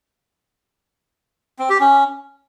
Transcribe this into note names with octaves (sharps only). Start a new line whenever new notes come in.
C4
G4
C#4